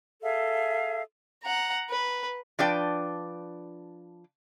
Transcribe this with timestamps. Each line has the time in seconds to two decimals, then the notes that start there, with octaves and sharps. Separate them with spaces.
0.22 G#4 A4 E5 F5
1.43 F#5 A#5
1.90 B4
2.59 F3 D4 B4 D5 G5